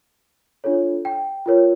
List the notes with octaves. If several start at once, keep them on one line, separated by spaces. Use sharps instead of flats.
D4 F4 A4 C#5
G5
F4 A#4 C#5